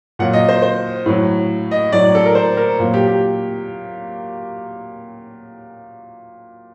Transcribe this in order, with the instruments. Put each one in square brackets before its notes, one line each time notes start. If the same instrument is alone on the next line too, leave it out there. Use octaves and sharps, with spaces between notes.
[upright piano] A#2 F#3 F#5
D#5
C5
C5
A2 F#3
D#5
A2 F#3 D5
A4
A#4
C5
A#4
A#2 F#3
G4
G4